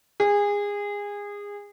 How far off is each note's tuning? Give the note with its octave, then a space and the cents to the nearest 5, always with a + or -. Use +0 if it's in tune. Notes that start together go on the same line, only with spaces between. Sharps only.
G#4 -25